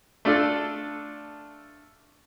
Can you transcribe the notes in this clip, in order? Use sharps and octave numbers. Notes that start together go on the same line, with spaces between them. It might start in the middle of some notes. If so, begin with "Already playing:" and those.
A3 D4 F4 A4